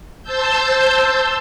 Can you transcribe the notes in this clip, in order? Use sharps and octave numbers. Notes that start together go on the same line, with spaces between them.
C5 A5 E6 G6